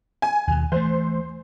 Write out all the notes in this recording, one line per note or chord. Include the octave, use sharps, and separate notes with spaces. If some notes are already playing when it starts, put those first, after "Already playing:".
G#5
D#2 B2
E3 A3 C5